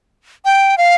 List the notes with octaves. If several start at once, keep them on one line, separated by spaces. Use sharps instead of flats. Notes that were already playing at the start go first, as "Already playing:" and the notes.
G5
F5